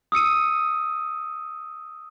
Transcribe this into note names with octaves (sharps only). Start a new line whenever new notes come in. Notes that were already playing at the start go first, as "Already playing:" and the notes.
D#6 E6 C#7 D#7